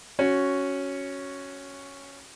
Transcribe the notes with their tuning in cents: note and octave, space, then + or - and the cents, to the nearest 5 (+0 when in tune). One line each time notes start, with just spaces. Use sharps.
C#4 +0 F#4 +0